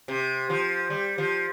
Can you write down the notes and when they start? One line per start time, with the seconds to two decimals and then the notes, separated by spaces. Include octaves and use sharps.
0.08 C3
0.50 F3
0.90 G3
1.18 F3